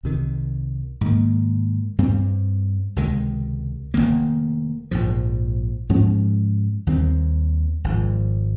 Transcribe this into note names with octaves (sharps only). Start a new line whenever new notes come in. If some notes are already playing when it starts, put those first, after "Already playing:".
C2 C3 D#3
G#2 D#3 A#3
G2 G3 C4
C#2 C3 D#3 G#3
F1 D#2 D#3 A#3
A#1 G#2 F3
G#2 F3 G#3 C#4
D#2 D#3 G3 C4
G#1 G#2 F3